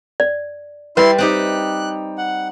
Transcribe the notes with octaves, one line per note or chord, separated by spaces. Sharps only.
D5
G3 E4 B4 E5 C6
C4 D#4 G4 F#6
F#5